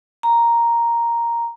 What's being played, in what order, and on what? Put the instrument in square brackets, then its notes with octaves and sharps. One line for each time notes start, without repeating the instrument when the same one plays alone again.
[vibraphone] A#5